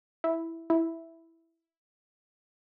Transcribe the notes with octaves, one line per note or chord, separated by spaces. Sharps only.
E4
E4